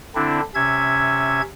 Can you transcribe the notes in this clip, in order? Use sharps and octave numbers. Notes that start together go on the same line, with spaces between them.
D3 C4 D4 E4
C3 C#4 E5 G#6